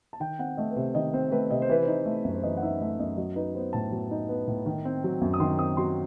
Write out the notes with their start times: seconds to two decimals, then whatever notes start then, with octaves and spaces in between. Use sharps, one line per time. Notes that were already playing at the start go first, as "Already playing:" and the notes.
0.13 A5
0.20 D#3 G5
0.39 C4 F#5
0.57 A3 D#5
0.71 B4
0.76 C3 C5
0.95 D#3 D#5
1.13 C4 C5
1.31 A3 B4
1.51 C3 D#5
1.62 C5
1.69 E3 B4
1.82 D#4 C5
2.06 A3
2.25 F#2
2.33 C5
2.43 E3 D#5
2.57 F#5
2.63 D#4 E5
2.81 A3 E5
2.99 F#2 D#5
3.18 F#3 D#5
3.36 D#4 B4
3.55 B3 C5
3.73 A2 A5
3.92 F#3
4.11 D#4
4.29 B3
4.47 A2
4.66 D#3
4.85 C4
5.04 F#3
5.21 F#2
5.34 D#6
5.40 D#3 C6
5.59 C4 D#6
5.77 F#3 C6